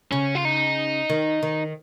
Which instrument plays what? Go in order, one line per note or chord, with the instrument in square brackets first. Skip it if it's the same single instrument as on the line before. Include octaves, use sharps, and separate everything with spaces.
[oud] C#3 [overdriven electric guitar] C#4
[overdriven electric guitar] F4
D#4
[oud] D#3
D#3